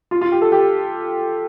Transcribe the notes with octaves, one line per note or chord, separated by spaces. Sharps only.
F4
F4
G4
A4
G4